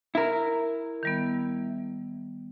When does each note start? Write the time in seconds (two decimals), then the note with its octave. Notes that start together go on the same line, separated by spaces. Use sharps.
0.15 E4 A#4
1.03 D#3 G3 B3